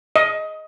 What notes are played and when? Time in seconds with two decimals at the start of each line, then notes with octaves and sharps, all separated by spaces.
0.16 D#5